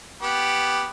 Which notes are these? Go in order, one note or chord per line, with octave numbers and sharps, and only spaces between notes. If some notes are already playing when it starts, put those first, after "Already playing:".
B3 G4